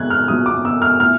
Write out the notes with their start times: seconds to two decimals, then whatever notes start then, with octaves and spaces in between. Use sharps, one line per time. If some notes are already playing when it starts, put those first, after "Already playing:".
Already playing: A#2 F#3 F#6 G#6
0.10 F6
0.28 A#2 F#3 D#6
0.46 D6
0.65 E6
0.82 F6
1.00 A2 F6